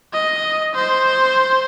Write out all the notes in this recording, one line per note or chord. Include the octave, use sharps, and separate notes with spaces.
D#5
C5